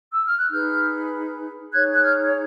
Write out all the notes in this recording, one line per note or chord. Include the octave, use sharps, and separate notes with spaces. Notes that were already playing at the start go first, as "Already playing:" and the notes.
E6
F6
F#6
D#4 G#4 B4 F6 G6
D#4 G#4 C#5 F#6 G#6
F#6
F6 G6